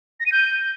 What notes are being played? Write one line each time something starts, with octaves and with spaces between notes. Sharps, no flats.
A#6
D#7
G6